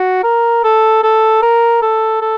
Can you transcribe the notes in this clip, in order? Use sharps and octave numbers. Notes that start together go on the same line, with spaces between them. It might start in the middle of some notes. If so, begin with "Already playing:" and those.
Already playing: F#4
A#4
A4
A4
A#4
A4
A4